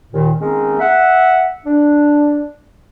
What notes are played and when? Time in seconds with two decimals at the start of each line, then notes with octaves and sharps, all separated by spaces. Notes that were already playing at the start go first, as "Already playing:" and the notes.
0.13 D#2 A#2 D#3
0.40 D#3 G#3 A#3 C4 C#4 D#4
0.80 E5 F#5
1.66 D4